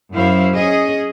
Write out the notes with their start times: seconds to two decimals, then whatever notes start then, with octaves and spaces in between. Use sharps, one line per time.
0.13 F#2 E4 C5 F5
0.55 C#4 G#4 D#5